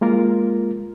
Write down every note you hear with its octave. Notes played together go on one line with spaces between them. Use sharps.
G#3 A#3 F4 A#4